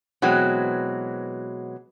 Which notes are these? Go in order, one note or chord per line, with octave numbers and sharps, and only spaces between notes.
B2 E3 F#3 G#3 C4